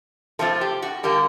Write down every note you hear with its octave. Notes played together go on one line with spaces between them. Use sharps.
C3 F3 A3 C4 F4 A4
G4
F#4
D3 G3 A#3 G4